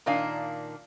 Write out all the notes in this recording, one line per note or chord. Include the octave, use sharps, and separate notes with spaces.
A#2 D#3 D4 F5 G#5